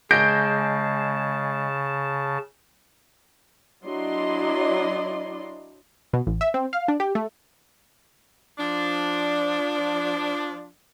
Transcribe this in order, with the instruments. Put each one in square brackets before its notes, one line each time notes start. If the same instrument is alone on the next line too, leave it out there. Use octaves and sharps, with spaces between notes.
[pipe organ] C#3 A5 [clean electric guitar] G#3 [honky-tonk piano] G6 A#6 D7
[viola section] F#3 D4 E4 D5 D#5 C6
[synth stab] B2
A1
E5
C4
F5
D4
G4
A3
[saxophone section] F3 D4